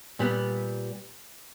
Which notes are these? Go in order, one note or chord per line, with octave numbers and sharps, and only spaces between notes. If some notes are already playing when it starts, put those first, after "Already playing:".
A#2 G3 B3